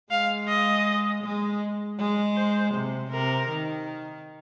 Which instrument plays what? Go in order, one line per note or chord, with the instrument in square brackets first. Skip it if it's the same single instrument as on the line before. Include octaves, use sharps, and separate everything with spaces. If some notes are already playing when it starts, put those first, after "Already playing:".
[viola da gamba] G#3 [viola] F5
[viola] D#5
[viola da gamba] G#3
G#3
[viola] C5
[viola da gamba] C3
[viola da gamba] C3 [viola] A#4
[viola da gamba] D#3